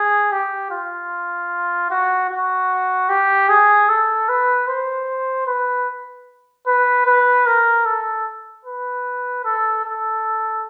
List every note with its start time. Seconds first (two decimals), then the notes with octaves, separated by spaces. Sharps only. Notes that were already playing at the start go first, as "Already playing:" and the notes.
Already playing: G#4
0.32 G4
0.71 F4
1.91 F#4
2.30 F#4
3.09 G4
3.49 G#4
3.89 A4
4.29 B4
4.68 C5
5.47 B4
6.67 B4
7.06 B4
7.46 A#4
7.85 A4
8.65 B4
9.45 A4
9.84 A4